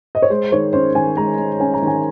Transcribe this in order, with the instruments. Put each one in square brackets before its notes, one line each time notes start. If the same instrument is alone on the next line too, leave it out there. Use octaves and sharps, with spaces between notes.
[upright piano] D#5
C#5
G#3 C5
D#3 C#5
C#4 C5
D#3 G#5
G#3 A#5
D#3
C#4 G#5
A#5
D#3
G#5